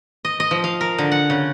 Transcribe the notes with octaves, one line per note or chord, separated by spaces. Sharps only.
D#5
D#5
F3
F5
A#4
D3
F#5
C#3